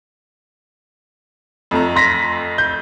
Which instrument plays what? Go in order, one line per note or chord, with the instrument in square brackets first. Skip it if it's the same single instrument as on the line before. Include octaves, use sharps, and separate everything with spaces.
[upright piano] F2 A3 A#5
[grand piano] C6 A#6 B6
G6